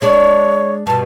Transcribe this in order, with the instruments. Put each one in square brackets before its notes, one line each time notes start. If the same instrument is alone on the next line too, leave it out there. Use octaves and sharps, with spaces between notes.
[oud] G#3 D4 D5 [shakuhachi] C#5
[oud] G2 B2 [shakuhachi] A5